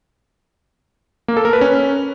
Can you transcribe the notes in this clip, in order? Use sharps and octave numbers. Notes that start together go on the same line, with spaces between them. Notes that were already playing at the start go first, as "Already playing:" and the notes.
A#3
A4
A#4
B4
C#4